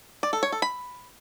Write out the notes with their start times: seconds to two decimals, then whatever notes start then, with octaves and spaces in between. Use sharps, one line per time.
0.23 D5
0.33 A4
0.43 C#5
0.52 A4
0.62 B5